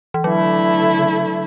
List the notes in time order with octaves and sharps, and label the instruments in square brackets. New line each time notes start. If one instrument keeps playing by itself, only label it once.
[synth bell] E3
[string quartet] D3 A3 E4 [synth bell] F#3